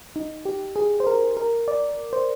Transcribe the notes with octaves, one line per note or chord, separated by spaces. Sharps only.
D#4
G4
G#4
C5
A#4
A#4
D5
C5